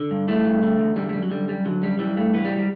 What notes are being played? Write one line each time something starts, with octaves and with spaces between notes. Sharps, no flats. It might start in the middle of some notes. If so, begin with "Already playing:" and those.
Already playing: D3
G2
E3 A3
G2
D3
E2
D3 G3
A3
F#2 G3
F#3
D3 G3
F#2 G3
D3 F#3
F#2 G3
E3 G3
G2 A3
E3 B3
G3
G3